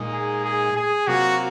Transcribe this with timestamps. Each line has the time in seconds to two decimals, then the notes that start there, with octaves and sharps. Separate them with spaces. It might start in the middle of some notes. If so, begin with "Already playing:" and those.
Already playing: A#2 G#3 D#4
0.13 G#4
0.45 G#4
0.76 G#4
1.07 C3 F#3 A#3 F4 F#4